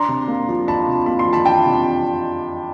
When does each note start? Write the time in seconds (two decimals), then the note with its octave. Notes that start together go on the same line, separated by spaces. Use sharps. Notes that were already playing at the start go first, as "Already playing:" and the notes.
Already playing: D4 A#5 C6
0.08 C3
0.28 A#3
0.48 F3
0.67 D4 A5 B5
0.88 C3
1.06 A#3 B5
1.19 C6
1.27 F3
1.33 A5 B5
1.45 D4 G5 A5
1.65 C3